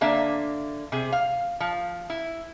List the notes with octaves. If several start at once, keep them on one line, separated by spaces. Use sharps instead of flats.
D3 A#3 D4 E5
C3 G#4
F5
F3
E4